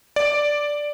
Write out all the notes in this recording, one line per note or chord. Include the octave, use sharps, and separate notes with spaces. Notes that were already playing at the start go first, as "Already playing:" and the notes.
D5